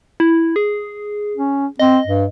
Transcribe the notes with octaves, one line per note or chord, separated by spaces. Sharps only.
E4
G#4
C#4
C4 D#5
G2